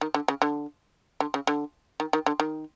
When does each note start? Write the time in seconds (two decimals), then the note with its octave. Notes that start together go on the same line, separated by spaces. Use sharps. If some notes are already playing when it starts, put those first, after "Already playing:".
0.01 D#3
0.14 D3
0.28 C#3
0.42 D3
1.20 D3
1.34 C#3
1.47 D3
2.00 D#3
2.13 D#3
2.26 D3
2.40 D#3